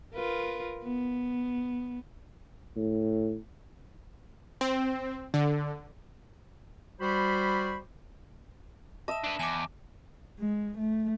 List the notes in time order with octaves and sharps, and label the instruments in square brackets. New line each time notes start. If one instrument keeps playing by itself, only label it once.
[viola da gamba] F4 A#4 B4
B3
[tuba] A2
[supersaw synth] C4
D3
[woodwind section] G3 F#4 C5 B5
[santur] D#5 E5 [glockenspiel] A5 E7
[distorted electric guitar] D4 B4
[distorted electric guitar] E2 [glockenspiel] G#5 D6
[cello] G#3
A3